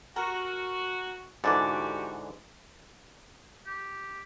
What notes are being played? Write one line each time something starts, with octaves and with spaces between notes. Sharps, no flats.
F#4 A#4
G#2 D3 E3 F#4 G4 D5
G4